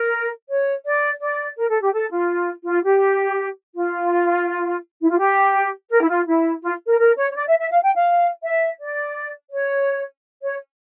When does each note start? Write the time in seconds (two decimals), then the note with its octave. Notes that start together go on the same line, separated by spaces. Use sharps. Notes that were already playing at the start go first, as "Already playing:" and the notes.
Already playing: A#4
0.49 C#5
0.85 D5
1.22 D5
1.57 A#4
1.69 A4
1.81 G4
1.93 A4
2.11 F4
2.66 F4
2.84 G4
3.74 F4
5.02 E4
5.10 F4
5.18 G4
5.91 A#4
6.02 E4
6.09 F4
6.27 E4
6.63 F4
6.87 A#4
6.99 A#4
7.17 C#5
7.31 C#5
7.35 D5
7.47 E5
7.59 E5
7.71 F5
7.83 G5
7.95 F5
8.43 E5
8.80 D5
9.52 C#5
10.43 C#5